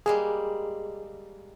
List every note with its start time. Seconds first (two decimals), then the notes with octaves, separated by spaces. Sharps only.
0.06 G3 G#3 A#3 G#4